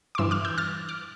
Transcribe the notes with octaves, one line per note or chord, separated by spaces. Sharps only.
D6
G2 E3 C6 E6
D6 F6
E6 G6
F6 A6
D6 F6